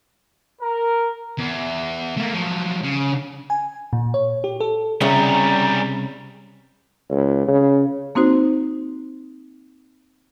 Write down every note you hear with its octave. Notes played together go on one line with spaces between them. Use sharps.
A#4
E2
A3 A#3
F3 F#3
C#3
G#5
A#2
C#5
G4
A4
C2 C#3 G3 C#4 A#5
C#2
C#3
A#3 C4 D#4 F#4 C5